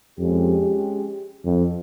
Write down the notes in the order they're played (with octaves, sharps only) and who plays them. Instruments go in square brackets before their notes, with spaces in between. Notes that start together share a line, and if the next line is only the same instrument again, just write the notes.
[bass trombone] F2 [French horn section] G#3 C#4 G4
[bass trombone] F2